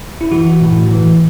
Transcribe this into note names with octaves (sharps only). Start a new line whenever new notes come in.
E4
E3 F#4
A2
E3